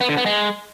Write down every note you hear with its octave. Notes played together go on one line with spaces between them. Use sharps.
B3
D3
B3
G#3